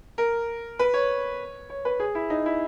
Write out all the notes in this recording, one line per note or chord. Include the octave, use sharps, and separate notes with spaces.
A#4
B4
C#5
C#5
B4
G#4
E4
D#4
E4